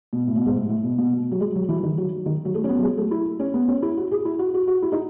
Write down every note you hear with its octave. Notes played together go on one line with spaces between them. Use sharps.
B2
A2
B2
G#2
A2
A2
B2
B2
B2
F#3
G#3
F#3
E3
D#3
F#3
D#3
F#3
A3
C#4
B3
F#3
G#3
A3
E4
C#4
B3
C#4
E4
F#4
G#4
E4
F#4
F#4
F#4
E4
D#4